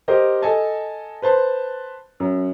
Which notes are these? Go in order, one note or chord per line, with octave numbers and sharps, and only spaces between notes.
G4 A#4 C5 D#5
A4 D#5 G#5 A5
B4 C5 A5 C6
F#2